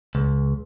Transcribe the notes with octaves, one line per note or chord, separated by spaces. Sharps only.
C#2